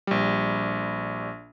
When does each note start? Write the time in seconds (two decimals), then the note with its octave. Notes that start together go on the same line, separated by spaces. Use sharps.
0.07 A#1 G3